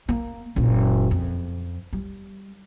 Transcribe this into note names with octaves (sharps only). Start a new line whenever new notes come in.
A#3
F#1 A#2
F2
G3